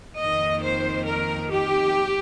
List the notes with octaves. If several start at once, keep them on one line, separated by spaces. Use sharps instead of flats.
F2 D#3 A#3 D#5
C5
A#4
G4